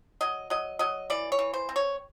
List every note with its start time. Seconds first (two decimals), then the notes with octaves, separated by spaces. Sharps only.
0.21 F#3 D#5
0.50 F#3 D#5
0.79 F#3 D#5
1.10 E3 D5
1.32 C#5
1.39 E3
1.54 C5
1.69 C4
1.76 C#5